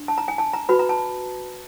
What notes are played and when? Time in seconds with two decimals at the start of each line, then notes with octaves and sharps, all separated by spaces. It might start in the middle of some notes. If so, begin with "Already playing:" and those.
Already playing: D4
0.08 A5
0.18 A#5
0.28 G#5
0.38 A5
0.53 A#5
0.69 F#4 B4 B5
0.79 A#5
0.89 A5